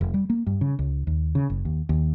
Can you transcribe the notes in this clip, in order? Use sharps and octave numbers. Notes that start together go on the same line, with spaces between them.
F1
G3
A#3
G2
C#3
C#2
D#2
C#3
F#1
D#2
D#2